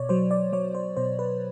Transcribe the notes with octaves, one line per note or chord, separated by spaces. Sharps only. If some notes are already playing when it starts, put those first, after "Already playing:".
Already playing: B2 C#5 D5
F#3 C5
D5
F#3 C#5
C5
B2 C5
B4